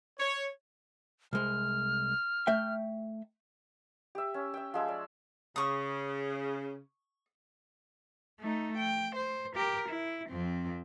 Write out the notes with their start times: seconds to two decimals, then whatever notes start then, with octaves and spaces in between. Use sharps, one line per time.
0.20 C#5
1.33 C2 G#3 F6
2.47 A3 E5 G5
4.15 G4 E5
4.34 C#4
4.54 E5 G5
4.74 F3 G#3 E5
4.88 D5
5.56 C#3 C#6 D#6
8.40 A3 D#4
8.78 G5
9.16 C5
9.56 G4 A#4
9.89 E4
10.30 F2 C4